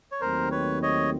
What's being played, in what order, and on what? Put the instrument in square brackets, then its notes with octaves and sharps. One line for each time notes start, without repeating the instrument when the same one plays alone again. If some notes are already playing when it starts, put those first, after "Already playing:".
[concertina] C#5
[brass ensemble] D#2 D#3 F#3 A3 C4 [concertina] A#4 C5
[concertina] B4 C#5
C#5 D#5